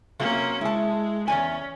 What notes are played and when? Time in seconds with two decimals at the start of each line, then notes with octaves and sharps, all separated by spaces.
0.20 C3 F#3 A#3 C#4 F4
0.61 G#3 E4 A5
1.28 E2 C#4 D5 G#5